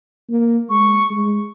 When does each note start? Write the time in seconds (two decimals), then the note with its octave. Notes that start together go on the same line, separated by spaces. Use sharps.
0.29 A#3
0.70 G#3 C#6
1.10 G#3